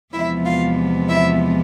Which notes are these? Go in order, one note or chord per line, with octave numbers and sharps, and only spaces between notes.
E2 C3 F3 G#3 B3 E4 E5
F4 F5
E4 E5